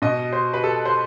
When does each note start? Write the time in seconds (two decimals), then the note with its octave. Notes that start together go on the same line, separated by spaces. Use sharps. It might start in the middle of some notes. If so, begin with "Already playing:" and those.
0.02 B2 D#5
0.33 C5
0.54 B4
0.64 A4
0.85 C5